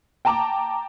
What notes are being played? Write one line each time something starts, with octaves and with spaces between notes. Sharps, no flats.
G5 A5 A#5 D6